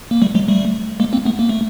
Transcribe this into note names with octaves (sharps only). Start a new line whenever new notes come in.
A#3
G3 A3
F#3 G#3
G3 A3
G#3 A#3
A#3 C4
A3 B3
A#3
A3